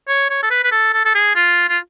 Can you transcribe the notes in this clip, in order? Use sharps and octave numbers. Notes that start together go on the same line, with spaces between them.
C#5
C#5
A4
B4
B4
A4
A4
A4
G#4
F4
F4